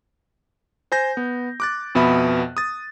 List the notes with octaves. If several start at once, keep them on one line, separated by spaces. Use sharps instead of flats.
C5 G#5 G6 A#6
B3
D6 F#6 A6
F2 B2 B3 E5 B5
D#6 A6